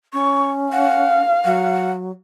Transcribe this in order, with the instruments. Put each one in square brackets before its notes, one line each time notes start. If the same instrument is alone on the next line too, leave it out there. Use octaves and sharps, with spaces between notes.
[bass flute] C#4 [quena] C#6
[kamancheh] F5 [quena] F#5
[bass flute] F#3 [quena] F#5